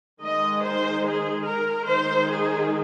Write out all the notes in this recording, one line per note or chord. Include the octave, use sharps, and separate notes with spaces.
D#3 G#3 D#4 D#5
C5
G#4
A#4
D#3 G#3 D#4 C5
G#4